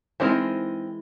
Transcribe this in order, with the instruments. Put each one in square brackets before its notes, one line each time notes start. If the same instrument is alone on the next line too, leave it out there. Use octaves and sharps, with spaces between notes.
[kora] E3 G#3 A#4 [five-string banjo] C4 D#4 C5